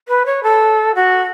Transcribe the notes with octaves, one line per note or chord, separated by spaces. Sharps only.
B4
C#5
A4
F#4